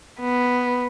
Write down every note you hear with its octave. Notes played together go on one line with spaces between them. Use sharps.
B3